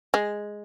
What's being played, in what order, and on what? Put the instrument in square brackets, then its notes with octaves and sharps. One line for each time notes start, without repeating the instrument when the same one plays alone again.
[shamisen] G#3